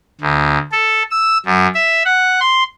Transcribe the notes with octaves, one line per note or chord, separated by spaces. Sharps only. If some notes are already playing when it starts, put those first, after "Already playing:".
D2
A4
E6
F#2
E5
F#5
C6